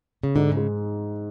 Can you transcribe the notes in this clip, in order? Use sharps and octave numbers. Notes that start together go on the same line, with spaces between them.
C#3
G#2 D3
C#3
G#3